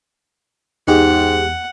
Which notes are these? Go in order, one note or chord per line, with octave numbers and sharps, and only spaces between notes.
E2 G#2 D#4 G4 G#4 F#5